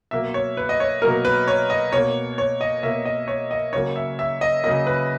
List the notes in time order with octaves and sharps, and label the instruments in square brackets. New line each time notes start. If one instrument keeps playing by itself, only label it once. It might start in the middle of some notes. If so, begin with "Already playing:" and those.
[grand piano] B2 F#3 A#3 E5
C#5
B4
D#5
C#5
B2 F#3 A#3 A#4
B4
C#5
D#5
B2 A#3 C#5
C#5
D#5
B2 A#3 E5
D#5
C#5
D#5
C#3 F#3 A#3 C#5
E5
E5
D#5
C#3 F#3 A#3 D#5
B4